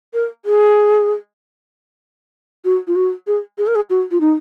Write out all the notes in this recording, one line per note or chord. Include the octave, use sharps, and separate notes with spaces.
A#4
G#4
F#4
F4
F#4
G#4
G#4
A#4
G#4
F#4
F4
D#4